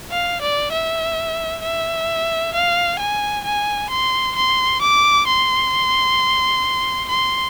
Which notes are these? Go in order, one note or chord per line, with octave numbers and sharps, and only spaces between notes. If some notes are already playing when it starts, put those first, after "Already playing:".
F5
D5
E5
E5
F5
G#5
G#5
C6
C6
D6
C6
C6